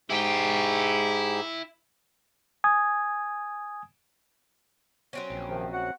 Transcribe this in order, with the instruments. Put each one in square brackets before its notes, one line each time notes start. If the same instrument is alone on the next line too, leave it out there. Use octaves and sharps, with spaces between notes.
[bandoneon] G#2 G4 G#4 [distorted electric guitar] E4 G5
[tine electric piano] G#5 D#6 G#6
[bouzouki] F#3 C4 C#4
[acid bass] A#1
[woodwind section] C3 D#3 F3
F#4 F#5